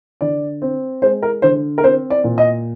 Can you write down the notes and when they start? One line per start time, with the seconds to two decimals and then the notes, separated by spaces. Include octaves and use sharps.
0.21 D3 D5
0.62 C4
1.02 G#3 C5
1.22 A#4
1.42 D3 C5
1.78 A#4
1.83 C4 C5
2.10 D5
2.24 A#2
2.38 D#5